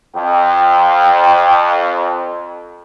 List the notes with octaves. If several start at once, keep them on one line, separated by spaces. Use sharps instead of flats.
F2 G5